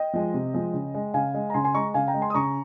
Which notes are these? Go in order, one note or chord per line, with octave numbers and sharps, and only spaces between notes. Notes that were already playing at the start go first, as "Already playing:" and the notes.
Already playing: D#5 G5
F3 G#3
C3
F3 G#3
C#3
G#3
C#3 F5 G#5
G#3
A#5
C#3 G#5 C6
G#5 C6
G#3 A#5 C#6
C#3 F5 G#5
G5 A#5
G#3
G#5 C6
D#6
C#3 A#5 C#6